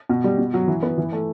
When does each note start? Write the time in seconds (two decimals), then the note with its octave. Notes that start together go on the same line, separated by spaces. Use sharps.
0.09 B2
0.24 G3
0.38 B2
0.54 F#3
0.68 E3
0.83 B3
0.98 E3
1.12 A3